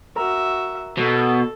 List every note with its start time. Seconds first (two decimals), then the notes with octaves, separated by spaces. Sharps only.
0.16 F#4 A#4 E5 A#5
0.98 B2 A4